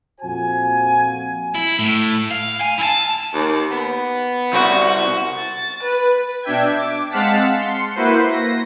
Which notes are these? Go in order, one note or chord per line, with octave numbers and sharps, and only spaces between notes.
F2 A#2 F4 F#4 C5 G#5
E4
A2
F5
G#5
E4 A5
D#2
B3
C2 F#4
A6
B4
B2 D4 E5 G5 G#6
D6
G#3 C4 F5 F#5 A5 B6
C6 C#7
A#3 E4 F#4 B4 C5
A#6